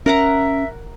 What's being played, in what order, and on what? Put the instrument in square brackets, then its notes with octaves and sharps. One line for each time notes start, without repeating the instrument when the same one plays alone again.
[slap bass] C#4 [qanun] A#4 F#5 A#5 [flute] E5